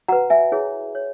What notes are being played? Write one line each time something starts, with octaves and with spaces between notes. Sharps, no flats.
F#4 B4 F#5 A#5
E5 G#5
E4 G#4 C#5
C#5